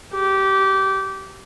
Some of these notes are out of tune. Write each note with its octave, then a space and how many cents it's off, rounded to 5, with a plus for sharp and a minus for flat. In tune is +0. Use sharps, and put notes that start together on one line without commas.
G4 -20